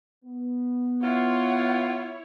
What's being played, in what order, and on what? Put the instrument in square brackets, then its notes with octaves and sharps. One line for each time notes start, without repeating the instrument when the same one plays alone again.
[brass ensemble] B3
[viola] E4 C#5 [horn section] F4 [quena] F#5